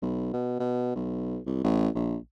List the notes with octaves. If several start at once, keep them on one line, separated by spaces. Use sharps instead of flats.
B1
B2
B2
B1
C2
A1
A#1